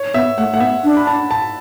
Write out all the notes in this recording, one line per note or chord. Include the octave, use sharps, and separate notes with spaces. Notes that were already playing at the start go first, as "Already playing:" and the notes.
Already playing: C#5
B3 E5
A3 F#5
A3 F#5
B3 E5
D4
B5
A5
A5